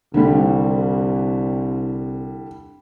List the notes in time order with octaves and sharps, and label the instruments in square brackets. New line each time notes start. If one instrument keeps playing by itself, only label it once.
[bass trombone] C2 [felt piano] D3 G3